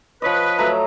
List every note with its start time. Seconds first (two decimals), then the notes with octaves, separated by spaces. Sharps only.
0.22 F3 B4 C#5 D#5
0.58 F#3 A3 A#5